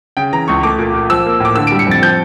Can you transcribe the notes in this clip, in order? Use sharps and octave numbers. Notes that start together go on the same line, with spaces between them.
C#3 G5
E3 A#5
C#2 C#6
A3 D6
A#2
A#2
F3 E6
A#3
A2 D6
D3 E6
D7
G3
C#7
F2 A6
F3 G6